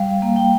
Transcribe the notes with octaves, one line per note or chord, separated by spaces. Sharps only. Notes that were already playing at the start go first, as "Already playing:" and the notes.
Already playing: G3 F5
A#3
G5